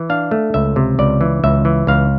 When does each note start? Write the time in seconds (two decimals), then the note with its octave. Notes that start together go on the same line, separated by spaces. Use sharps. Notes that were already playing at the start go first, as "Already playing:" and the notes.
Already playing: E3
0.10 D4 F5
0.31 A3
0.54 C#2 E5
0.76 C3
0.99 C#2 D5
1.21 E3
1.44 C#2 E5
1.65 E3
1.87 C#2 F5